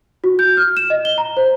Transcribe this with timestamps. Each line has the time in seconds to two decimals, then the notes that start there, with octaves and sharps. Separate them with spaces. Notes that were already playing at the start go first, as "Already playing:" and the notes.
0.24 F#4
0.39 G6
0.57 F6
0.77 E7
0.90 D#5
1.05 G7
1.18 A#5
1.37 C5